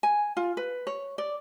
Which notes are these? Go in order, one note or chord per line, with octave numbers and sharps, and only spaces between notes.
G#5
F4
B4
C#5
D5